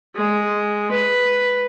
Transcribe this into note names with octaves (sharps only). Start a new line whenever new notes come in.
G#3
B4